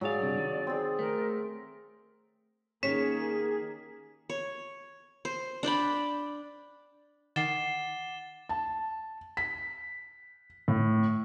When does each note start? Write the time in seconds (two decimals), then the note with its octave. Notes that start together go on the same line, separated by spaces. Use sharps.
0.01 G#2 F#3 G#4 D5 F5 G#5
0.20 G2 C3
0.37 D#3
0.67 C4 G#4
0.99 A3 A#4
2.83 D#3 A#3 C#4 G4 G#4 C#5 B6
4.30 C#5
5.25 C5
5.63 D4 D5 G5 B5
7.36 D#3 F#5 D6 A6 C7 E7 G7
8.49 A5
9.37 B6
10.68 A2